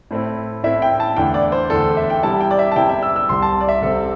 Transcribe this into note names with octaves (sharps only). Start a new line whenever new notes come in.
A2 A3 C4 E4
A2 A3 C4 E4 E5
G5
A5
E2 D3 A3 E4 G5
D5
C5
E2 D3 A3 E4 A4
E5
G5
C3 G3 E4 A5
G5
D5
E5
A5
C3 G3 E4 G5
E5
E6
E6
C2 C3 G3 C4 C6
A5
D5
E5
C2 C3 G3 C4 A4